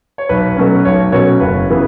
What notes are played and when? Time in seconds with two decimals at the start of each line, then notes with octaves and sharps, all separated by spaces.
0.18 C#5
0.29 B1 B4
0.56 B2 F#3 A3 C#4
0.85 B1 C#5
1.12 B2 F#3 A3 C#4 C#5
1.40 F#1 B4
1.70 C#3 E3 B3